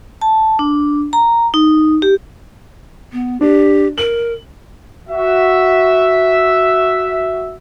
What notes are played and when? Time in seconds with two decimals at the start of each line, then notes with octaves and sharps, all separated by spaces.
0.21 A5
0.59 D4
1.13 A#5
1.54 D#4
2.02 G4
3.13 B3
3.41 D4 G4
3.98 A#4 F#7
5.09 F#4 E5